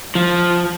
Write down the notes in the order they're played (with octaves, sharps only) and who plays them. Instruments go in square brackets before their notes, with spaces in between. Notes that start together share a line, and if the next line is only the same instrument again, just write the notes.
[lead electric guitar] F3